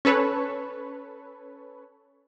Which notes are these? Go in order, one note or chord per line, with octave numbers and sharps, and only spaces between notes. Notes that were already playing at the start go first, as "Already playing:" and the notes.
C#4 A4 B4 C#5